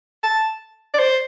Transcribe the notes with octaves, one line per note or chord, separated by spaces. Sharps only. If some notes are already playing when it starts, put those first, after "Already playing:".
A5
D5
C5